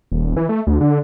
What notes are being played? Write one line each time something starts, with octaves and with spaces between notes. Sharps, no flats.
D#1
E3
A3
D2
D3